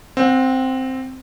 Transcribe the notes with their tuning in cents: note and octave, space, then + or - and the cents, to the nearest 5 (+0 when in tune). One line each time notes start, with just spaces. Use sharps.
C4 +0 F#5 -25